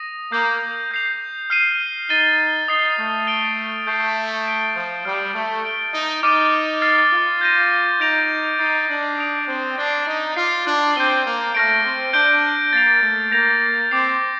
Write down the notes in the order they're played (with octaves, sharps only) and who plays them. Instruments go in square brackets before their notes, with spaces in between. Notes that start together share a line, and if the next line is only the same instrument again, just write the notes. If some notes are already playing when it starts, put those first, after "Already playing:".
Already playing: [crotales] D#6 A#6 D#7
[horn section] A#3 [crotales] D#6 G6 C7
[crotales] G6 C7 F7
F6 C7 D#7
[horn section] D#4 [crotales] A6 D#7 G7
[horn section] D#4 [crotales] D#6 A6 C7 G7
[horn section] A3
[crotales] A6 D7 G7
[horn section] A3 [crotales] G6 C7 G7
[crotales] A6 D7 G7
[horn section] F3
[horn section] G3 [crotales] F6 C7 G7
[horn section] A3
[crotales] A6 D7 G7
[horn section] D#4
[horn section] D#4 [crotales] D6 F6 A6 D#7
[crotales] F6 A6 C7
[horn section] F4
[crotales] G6 A#6 D#7
[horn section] D#4 [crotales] G6 A#6 D7 F7
[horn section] D#4 [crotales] A6 C7 D#7
[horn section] D4
[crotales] D#6 A6 D7 F7
[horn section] C4
[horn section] D4 [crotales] A6 C7 G7
[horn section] D#4
[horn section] F4 [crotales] D6 F6 C7
[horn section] D4
[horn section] C4 [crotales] G6 C7 D#7 G7
[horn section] A#3
[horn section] A3 [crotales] F6 A#6 D7
[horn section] C4
[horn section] D4 [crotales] G6 D7 G7
[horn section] A#3 [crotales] A6 C7 F7
[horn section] A3
[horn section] A#3 [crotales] G6 A#6 F7
[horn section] C4 [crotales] D6 G6 C7 F7